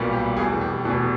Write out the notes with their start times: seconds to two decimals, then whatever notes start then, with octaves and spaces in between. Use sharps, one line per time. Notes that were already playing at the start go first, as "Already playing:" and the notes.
Already playing: B1 A#2 G3 B3
0.13 G4
0.37 F1 E2 B2 G#4
0.61 G4
0.85 F1 E2 B2